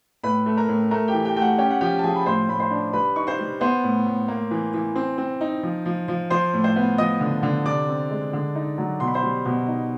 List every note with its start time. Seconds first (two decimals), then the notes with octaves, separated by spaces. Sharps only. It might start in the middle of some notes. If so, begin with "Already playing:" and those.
0.23 A2 B4 B5
0.46 A3
0.57 A#4 A#5
0.69 A2
0.91 A3 A#4 A#5
1.08 G4 G5
1.14 E3
1.25 G4 G5
1.36 A3 G5
1.42 F#4 F#5
1.58 C#4 G4 G5
1.70 F#5
1.81 F3 G4 G5
1.99 A5
2.03 F3 G#4 G#5
2.16 B5
2.26 A2 C5 C6
2.49 A2 B5
2.60 C5 C6
2.71 D4
2.93 G3 B4 B5
3.16 D#4 C#6
3.27 C5 C6
3.39 G3
3.61 B3 C5 C6
3.84 A2
4.06 A2
4.28 A#3
4.51 E3
4.74 E3
4.96 C4
5.18 C4
5.41 D#4
5.63 F3
5.86 F3
6.08 F3
6.30 F3 C5 C6
6.54 A2
6.64 C5 C6
6.76 B3
6.98 F3 D#5 D#6
7.20 D3
7.43 D3
7.65 C3 D5 D6
7.88 C4
8.11 G#3
8.33 D3
8.55 D#4
8.78 F#3
9.00 B2 C6
9.07 B5
9.14 C5 C6
9.23 G3
9.45 B2
9.68 D#4